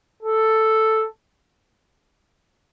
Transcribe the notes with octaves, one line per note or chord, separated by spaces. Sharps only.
A4